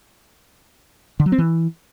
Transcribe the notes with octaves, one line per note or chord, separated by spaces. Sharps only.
D3
F#3
C4
E3